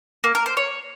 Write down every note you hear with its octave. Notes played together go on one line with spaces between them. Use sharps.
A#3
A#4
C5
C#5